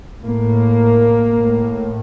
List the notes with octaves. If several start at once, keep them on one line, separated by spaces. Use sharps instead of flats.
A2 A#3
A2